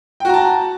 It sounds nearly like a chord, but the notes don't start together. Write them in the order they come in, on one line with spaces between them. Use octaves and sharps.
G5 F#4 A#5 A5